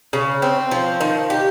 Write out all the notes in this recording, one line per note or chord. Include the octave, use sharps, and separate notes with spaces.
C#3
C4
F3
D#3
G4